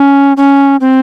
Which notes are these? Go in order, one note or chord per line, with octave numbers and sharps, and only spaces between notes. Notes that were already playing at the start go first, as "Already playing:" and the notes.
Already playing: C#4
C#4
C4